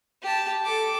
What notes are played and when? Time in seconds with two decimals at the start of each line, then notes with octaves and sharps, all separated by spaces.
0.23 G4 A5
0.65 A4 D6